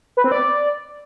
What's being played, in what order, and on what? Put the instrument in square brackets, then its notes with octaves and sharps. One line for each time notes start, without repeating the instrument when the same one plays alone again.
[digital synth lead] B4
C4
D5